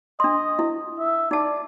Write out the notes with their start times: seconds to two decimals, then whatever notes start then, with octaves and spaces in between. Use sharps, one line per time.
0.20 D4 D#5 C6
0.59 E4
0.99 E5
1.31 D#4 D5 A5